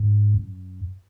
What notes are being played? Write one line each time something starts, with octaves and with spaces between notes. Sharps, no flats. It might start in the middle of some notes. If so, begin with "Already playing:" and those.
Already playing: G#2
F#2